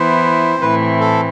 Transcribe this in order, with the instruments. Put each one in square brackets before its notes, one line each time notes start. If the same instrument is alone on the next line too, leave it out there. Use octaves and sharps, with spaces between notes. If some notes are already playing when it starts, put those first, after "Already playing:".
Already playing: [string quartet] E3 B3 E4 [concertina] C5
[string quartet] A2 E3 A3 C4 E4 [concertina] B4
[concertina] A4